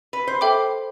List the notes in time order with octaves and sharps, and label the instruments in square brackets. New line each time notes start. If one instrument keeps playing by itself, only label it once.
[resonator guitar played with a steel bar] B4
C5
[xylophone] A4 E5 G5 D6